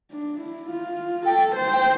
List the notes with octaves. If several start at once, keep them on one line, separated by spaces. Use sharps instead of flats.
D4
E4
F4
A4 G5
C5
G5